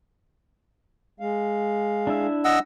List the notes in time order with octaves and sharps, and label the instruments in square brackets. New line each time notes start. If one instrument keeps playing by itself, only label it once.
[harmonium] G#3 F5
[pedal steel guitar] D4 E4 E5
[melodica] D#5 F#5 E6